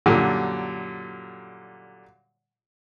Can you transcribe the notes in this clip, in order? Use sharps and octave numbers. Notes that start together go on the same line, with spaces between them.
F#2 A#2 D3 G3